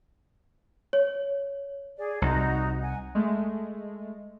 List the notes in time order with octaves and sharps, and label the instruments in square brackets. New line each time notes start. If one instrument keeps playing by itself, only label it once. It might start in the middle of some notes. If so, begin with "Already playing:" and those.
[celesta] C#5
[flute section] G#4 D5
[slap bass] C2 [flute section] D#4 F#4 A#5
[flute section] F#5 G#5
[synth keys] G#3 A3